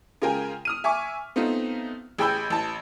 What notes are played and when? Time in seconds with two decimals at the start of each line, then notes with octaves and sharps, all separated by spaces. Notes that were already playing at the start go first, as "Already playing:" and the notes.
0.22 C#3 G#3 F4 A#4 G5 G#5
0.65 D#6 F6 D#7
0.84 E5 G#5 C#6 D6
1.36 A3 B3 C4 D#4 F4
2.18 A1 G#4 G5 B5 E6 G6
2.50 A1 A5